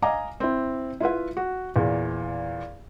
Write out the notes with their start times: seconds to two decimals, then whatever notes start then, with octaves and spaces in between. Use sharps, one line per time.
0.02 D#5 F5 G#5 A#5 D6
0.40 C4 E4
1.00 E4 F4 B4 E5
1.37 F#4
1.76 E2 A#2